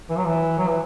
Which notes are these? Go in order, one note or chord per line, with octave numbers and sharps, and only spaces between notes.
E3
F#3
E3
F#3
E3